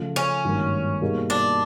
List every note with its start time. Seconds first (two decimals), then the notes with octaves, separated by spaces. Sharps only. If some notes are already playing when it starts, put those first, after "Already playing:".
Already playing: C#3 F3 A3
0.16 C#4
0.45 G#1 G2 D#3 F#3 A#3
1.02 B2 G3 A#3 D#4 G#4
1.30 D4